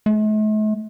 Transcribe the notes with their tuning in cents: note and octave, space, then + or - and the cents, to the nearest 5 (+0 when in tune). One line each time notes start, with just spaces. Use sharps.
A3 -45